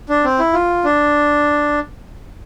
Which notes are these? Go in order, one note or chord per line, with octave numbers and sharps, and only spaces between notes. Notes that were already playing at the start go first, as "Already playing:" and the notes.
D4
C4
E4
F4
D4